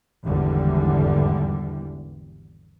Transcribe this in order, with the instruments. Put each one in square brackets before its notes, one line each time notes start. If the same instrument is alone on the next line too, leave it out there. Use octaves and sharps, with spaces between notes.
[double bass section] G#1 E2 D3 E3 G3